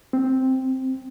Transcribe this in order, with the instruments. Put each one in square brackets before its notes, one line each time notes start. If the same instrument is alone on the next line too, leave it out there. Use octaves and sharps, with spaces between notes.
[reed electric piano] C4